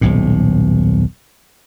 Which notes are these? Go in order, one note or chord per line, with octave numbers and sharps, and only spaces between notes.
D#1 B1 A2